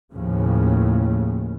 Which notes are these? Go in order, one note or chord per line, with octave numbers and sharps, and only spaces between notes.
D#2 A2 C#3 F3